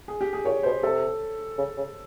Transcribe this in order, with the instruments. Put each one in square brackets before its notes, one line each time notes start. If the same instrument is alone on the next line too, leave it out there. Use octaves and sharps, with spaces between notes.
[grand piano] G#4
G4
G#4
[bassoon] A#2 [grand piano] C#5
[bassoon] B2 [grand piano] C5
[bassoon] C3 [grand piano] A4
[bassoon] C#3
C#3